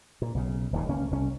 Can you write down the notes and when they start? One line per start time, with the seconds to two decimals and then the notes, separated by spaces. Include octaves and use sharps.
0.22 A#2
0.35 B1 C#3
0.73 D#1 D#2 G#2 C#3
0.89 C#2 A#3 C#4
1.11 C2 C#4